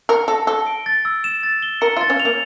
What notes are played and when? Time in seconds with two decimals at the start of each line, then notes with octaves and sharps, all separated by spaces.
0.09 A#4 C#7
0.28 A4 A#6
0.47 A4 G7
0.66 D7
0.86 A6
1.05 E6
1.24 E7
1.43 A6
1.63 G7
1.81 A#4 C#7
1.97 F4
2.01 A6
2.10 C#4
2.20 F7
2.25 A#3